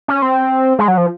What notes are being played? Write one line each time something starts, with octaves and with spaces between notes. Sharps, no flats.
C#4
C4
G#3
F#3
F3